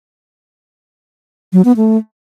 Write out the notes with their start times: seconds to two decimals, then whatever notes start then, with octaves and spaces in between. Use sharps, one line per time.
1.53 F#3
1.65 B3
1.77 A3